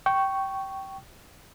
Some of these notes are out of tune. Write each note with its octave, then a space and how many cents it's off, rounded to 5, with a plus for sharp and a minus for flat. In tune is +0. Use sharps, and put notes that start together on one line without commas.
G5 -15 C#6 +0